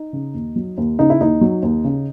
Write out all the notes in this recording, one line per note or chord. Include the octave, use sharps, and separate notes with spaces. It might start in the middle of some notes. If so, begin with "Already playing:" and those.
Already playing: D#4
C#3
D#2
F#3
D#2
C#3 D#4
E4
D#2 D#4
F#3
D#2
C#3